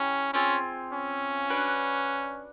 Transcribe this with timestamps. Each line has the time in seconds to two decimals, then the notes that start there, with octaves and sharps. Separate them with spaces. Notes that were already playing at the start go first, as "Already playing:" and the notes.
Already playing: C#4 E4 G4
0.33 C4 C#4 F4 G#4
0.92 C#4
1.50 D4 F#4 B4